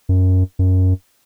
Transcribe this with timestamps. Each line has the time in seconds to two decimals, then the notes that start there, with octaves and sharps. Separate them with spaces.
0.09 F#2
0.59 F#2